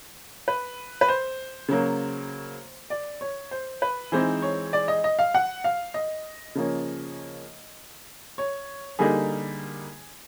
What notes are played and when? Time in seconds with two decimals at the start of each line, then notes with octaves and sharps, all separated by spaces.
0.48 B4
1.01 B4
1.08 C5
1.68 C#3 F#3 A#3
2.90 D5
3.21 C#5
3.51 C5
3.82 B4
4.12 E3 G#3 C4 D#4 C5
4.42 C#5
4.73 D5
4.88 D#5
5.04 D#5
5.19 F5
5.35 F#5
5.64 F5
5.94 D#5
6.55 C#3 F3 A#3 C#4
8.38 C#5
8.99 D3 G3 A#3 D#4 G#4